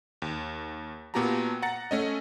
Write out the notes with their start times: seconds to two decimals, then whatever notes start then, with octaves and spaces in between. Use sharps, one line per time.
0.22 D#2
1.14 A#2 B3 F#4 G4 A5 A#5
1.62 F#5 A#5 A6 C#7
1.91 A3 C#4 D#5